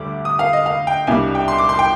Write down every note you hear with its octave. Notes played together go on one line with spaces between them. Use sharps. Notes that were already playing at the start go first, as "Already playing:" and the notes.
Already playing: D2 D3 G3 D6
D#6
F5
D#5
F5
G5
C2 B2 G3 D4 G#5
G5
C6
D6
C6
G5